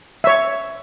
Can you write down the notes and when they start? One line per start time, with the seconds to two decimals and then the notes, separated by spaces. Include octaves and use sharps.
0.24 C#5 E5